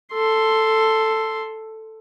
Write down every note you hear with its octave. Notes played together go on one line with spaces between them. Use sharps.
A4 C6